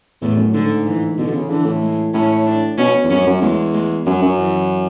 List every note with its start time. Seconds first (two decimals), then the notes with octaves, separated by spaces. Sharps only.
0.21 E2 A2
0.37 F#2
0.54 G#2 D3
0.87 E3
1.18 B2 D3
1.34 C#3
1.49 D3 E3
1.65 A2
1.82 G#3
2.14 A2 C#4
2.46 D4
2.78 B2 C#4
3.04 E2
3.09 F#2 C#4
3.27 F#2
3.42 E2 G#3
3.74 G#3
4.06 F#2 F#3
4.22 F#2
4.38 E3